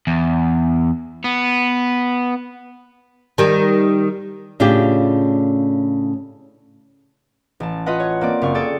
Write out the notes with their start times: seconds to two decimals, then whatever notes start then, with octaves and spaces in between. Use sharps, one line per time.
0.07 E2
1.25 B3
3.38 D#3 G3
4.60 A2 C#3 C#4 D4 F4 G4
7.60 A1 A5
7.86 F4 B4 D#5 F#5
8.00 C#5
8.21 A#3 C4 D5
8.42 F#1 F5 C#6
8.54 G#4 A4 D5 G5 A6 C#7